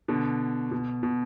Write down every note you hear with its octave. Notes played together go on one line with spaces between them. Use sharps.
B2 D3
B2
B2